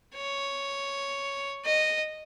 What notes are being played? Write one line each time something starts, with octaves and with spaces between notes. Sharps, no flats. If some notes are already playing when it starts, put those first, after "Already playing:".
C#5
D#5